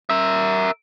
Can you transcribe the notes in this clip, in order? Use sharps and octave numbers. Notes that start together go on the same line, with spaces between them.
A#4 E5